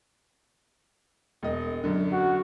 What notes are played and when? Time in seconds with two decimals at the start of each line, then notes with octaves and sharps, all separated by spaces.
1.43 E1 D#5
1.84 F#2 D3
2.12 F#4